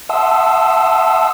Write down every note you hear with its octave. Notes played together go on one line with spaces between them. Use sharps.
E5 F#5 A5 C6 D#6 E6